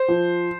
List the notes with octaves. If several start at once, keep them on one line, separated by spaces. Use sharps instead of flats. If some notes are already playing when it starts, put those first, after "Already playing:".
Already playing: C5
F3